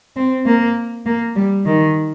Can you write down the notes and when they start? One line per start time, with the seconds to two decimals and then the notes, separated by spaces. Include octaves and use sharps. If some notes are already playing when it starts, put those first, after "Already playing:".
0.16 C4
0.46 A#3
1.05 A#3
1.36 G3
1.65 D#3